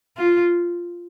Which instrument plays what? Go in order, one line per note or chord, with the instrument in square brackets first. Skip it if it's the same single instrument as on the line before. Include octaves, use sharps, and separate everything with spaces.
[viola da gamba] F4